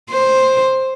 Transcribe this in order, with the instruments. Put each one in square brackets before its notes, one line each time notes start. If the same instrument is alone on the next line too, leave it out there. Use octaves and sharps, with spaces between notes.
[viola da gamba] C5